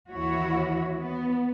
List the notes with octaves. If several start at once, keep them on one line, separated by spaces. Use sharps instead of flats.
D#2 E3 E4 F#4 C#5
B3